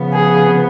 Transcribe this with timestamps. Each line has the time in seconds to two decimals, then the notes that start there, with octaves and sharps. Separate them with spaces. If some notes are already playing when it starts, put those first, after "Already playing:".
Already playing: C#3 F3 B3
0.13 G#4